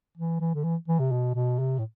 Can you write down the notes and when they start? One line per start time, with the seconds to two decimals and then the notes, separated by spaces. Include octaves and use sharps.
0.17 E3
0.41 E3
0.55 D3
0.64 E3
0.89 E3
1.00 C3
1.12 B2
1.35 B2
1.59 C3
1.79 A2